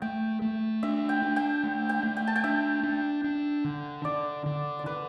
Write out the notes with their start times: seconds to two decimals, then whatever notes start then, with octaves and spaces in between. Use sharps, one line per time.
0.02 A3 G5
0.42 A3
0.83 D4 E5
1.09 G5
1.22 D4
1.36 G5
1.63 A3
1.89 G5
2.03 A3
2.17 G5
2.27 A5
2.36 G5
2.44 D4 E5
2.83 D4
3.24 D4
3.64 D3
4.05 D3 D5
4.46 D3
4.79 D5
4.86 D3 B4